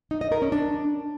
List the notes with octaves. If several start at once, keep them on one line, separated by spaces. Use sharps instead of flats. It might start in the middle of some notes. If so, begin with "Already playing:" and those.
D#4
D#5
A#4
C#4
D4